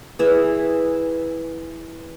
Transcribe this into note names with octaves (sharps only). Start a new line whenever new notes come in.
E3 G#4 E5